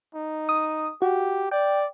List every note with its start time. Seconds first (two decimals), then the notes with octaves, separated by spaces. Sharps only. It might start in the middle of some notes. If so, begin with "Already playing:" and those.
0.15 D#4
0.49 D#6
1.02 F#4 G4
1.51 D5 G5